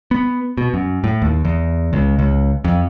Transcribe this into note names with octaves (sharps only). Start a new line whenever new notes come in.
B3
B2
F#2
A2
D#2
E2
C#2
C#2
F2